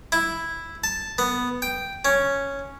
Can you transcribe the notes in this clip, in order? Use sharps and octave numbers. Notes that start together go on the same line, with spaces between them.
E4
A5
B3
G5
C#4